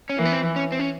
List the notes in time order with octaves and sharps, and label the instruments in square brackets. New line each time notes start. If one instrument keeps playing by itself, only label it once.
[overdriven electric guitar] C#4
[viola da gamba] E3 [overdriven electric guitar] A#3
[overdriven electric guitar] B3
C4
C#4
C4
C#4